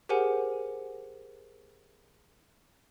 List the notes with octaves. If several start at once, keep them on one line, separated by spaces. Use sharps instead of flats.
G4 G#4 A#4 C5 F#5 G#5